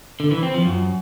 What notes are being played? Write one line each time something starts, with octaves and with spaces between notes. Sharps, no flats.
D3
E3
C4
F3
F#2